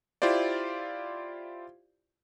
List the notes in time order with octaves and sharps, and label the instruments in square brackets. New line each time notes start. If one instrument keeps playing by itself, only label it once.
[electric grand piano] E4 F4 G4 C5 D5